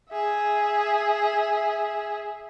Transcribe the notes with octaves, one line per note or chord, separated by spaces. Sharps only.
G#4 E5